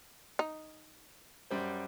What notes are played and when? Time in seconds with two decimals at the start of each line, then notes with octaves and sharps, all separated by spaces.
0.39 D#4
1.51 F#2 G3 C5